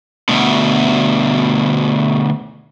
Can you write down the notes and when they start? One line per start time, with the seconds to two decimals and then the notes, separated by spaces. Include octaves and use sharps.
0.29 D2 B2